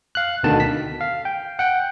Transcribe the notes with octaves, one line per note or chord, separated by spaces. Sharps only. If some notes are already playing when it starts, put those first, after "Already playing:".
F5 F#6
D2 B2 D3 D#3 A5
B6
F5
G5
F#5 G5